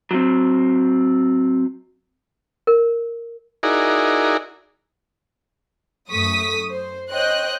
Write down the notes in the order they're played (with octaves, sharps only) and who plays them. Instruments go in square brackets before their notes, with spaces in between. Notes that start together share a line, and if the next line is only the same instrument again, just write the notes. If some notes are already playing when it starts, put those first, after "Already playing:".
[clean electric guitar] F#3 C4
[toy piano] A#4
[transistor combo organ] D#4 E4 F#4 G#4 A#4 D5
[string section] F#2 A3 C#6 D#6 B6
C5
C5 C#5 D#5 G5 F#6 G6